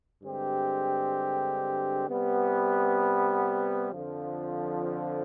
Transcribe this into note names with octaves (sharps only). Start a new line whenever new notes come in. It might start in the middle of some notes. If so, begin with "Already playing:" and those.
G2 D3 G#3 C4 G4
C3 G3 B3
F2 D3 F3